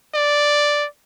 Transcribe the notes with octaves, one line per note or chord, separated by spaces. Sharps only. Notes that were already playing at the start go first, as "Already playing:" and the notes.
D5